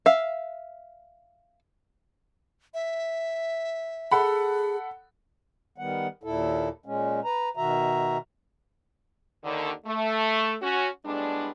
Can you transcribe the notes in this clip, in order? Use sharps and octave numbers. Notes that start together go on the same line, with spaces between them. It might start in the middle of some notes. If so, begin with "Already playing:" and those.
E5 F5
E5
G#4 A4 F#5 B5
D#3 G3 B3 F#5
D#2 A#2 E4 A4
A#2 G#3 C#4
B4 A#5
B2 D#3 F#4 E5 A#5
D#2 D3 D#3
A3
C#4 F#4
A2 G3 G#3 B3 D4